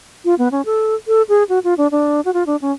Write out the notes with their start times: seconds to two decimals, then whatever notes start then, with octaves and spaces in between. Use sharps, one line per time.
0.25 F4
0.39 B3
0.52 C#4
0.66 A4
1.08 A4
1.29 G#4
1.49 F#4
1.64 F4
1.78 D4
1.91 D4
2.25 F#4
2.34 F4
2.47 D4
2.62 C#4